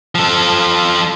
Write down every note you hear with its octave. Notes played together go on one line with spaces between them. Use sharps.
F3 A4